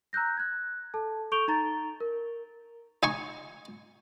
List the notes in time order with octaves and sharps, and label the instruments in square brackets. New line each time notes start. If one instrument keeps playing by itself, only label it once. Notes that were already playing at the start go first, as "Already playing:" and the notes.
[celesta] A#5 E6 F#6 G6 A#6
F#6 G#6
A4 A5
A4 C#6 G6 D7 F7 G7
D#4 A#5 A6
A#4
[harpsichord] D#4 G#5 C#6